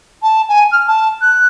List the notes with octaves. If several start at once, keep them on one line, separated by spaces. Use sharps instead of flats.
A5
G#5
F6
A5
F#6